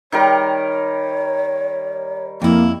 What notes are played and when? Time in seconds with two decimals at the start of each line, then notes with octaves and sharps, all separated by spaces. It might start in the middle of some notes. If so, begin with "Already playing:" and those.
0.12 D#3 G3 A#4 C#5
2.42 F2 A#3 E4